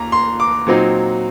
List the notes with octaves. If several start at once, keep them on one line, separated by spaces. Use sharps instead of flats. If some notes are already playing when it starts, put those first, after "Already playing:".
Already playing: D#2 A#3 A#5
C6
D6
A#2 F#3 C4 D#4